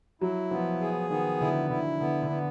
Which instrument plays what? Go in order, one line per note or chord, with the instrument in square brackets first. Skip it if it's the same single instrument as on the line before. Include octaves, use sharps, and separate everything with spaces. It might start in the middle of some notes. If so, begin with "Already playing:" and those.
[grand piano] F#3 [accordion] E4
[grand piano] F3 [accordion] B3
[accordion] G#4
[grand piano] D#3 [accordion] B3
[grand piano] D3 [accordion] E4
[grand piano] D3 [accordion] E4
[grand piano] D3 [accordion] B3
[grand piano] D3
[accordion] B3